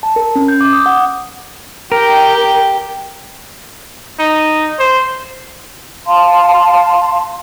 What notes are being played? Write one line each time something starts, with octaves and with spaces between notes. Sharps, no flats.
A5
A#4
C#4
G6
D6
D#6
F#5
G4 A#4 G5
D#4
C5
F5 A5 C6